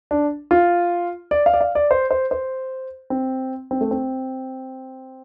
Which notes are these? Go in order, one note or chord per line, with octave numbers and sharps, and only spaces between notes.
D4
F4
D5
F5
D5
F5
D5
C5
C5
C5
C4
C4
A3
C4